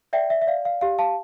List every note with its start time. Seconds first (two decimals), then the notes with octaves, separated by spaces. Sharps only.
0.13 D5 E5 G5
0.30 E5
0.42 E5
0.47 D5 F5
0.65 F5
0.81 G4 F5
0.99 F5 A5